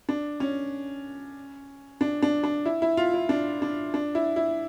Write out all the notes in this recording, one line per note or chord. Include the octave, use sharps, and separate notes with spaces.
D4
C#4
D4
D4
D4
E4
E4
F4
E4
D4
D4
D4
E4
E4